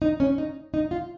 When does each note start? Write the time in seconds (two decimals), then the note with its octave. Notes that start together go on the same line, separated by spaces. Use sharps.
0.02 D#4
0.20 C#4
0.38 D#4
0.74 D#4
0.91 F4